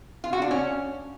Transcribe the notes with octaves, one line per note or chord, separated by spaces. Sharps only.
F4
F#4
D4
C#4